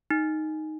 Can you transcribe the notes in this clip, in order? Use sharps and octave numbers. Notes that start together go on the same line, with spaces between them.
D#4